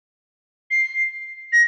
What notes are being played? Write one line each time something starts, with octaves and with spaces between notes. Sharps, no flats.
C7
A#6